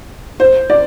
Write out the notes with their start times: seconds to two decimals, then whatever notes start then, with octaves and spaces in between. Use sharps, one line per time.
0.40 C5
0.70 D5